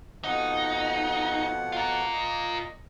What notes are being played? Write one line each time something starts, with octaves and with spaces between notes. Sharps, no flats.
F2 B2 D#4 F#5
F4 A#4
A#2 D#5